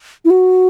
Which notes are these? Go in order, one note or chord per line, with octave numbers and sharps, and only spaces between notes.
E4
F#4